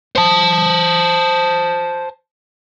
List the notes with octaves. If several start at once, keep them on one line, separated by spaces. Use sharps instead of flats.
C5 A5